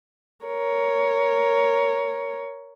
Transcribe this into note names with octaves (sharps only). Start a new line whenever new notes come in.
A#4 C#5